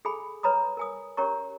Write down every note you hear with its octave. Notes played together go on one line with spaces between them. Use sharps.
G#4 A4 G#5 B5
B4 C#5 A#5 B5 D#6
A#4 G#5 D#6
C#4 G4 A#4 C#5 A#5 C#6